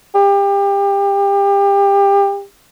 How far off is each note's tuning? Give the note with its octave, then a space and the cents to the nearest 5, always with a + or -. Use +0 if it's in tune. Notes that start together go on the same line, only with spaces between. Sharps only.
G4 +30